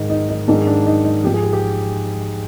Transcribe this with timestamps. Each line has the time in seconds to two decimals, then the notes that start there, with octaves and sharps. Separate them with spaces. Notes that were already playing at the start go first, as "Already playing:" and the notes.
Already playing: G#2 D#3
0.10 D#4
0.29 D#4
0.48 G#2 D#3 D4
0.67 D4
0.86 D#4
1.05 D#4
1.24 G#2 F3 G4
1.34 G#4
1.43 G4
1.53 G4